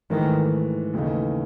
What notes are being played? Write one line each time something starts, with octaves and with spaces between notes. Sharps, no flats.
G#2 D#3 E3 A3
D#2 C#3 E3 A3 D#4